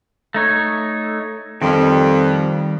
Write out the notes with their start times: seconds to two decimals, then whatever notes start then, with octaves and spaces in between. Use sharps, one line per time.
0.34 A3 D#4 C#5
1.62 F2 D#3 G3